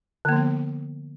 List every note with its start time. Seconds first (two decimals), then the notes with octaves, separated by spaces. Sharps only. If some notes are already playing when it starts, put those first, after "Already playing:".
0.25 D3
0.29 A#3
0.32 F3
0.36 B3